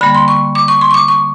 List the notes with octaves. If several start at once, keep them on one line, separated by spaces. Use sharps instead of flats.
D3 G3 A#3 B5
C6
C#6
D6
C#6
C6
C#6
D6
C#6